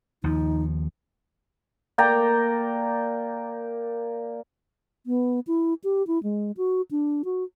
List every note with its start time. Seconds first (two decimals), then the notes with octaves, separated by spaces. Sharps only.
0.24 D#2 F3 D#4
1.98 A#3 D5 G5 A#5
5.06 B3
5.47 E4
5.84 G4
6.07 E4
6.23 G#3
6.57 F#4
6.91 D4
7.25 F#4